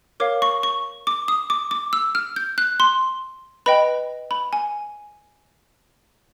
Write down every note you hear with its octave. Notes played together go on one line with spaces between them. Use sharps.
A#4 C#5 F5 D6
C#6
C#6
D6
D#6
D6
D6
E6
F6
G6
F#6
C6
B4 D#5 G5 B5
B5
G#5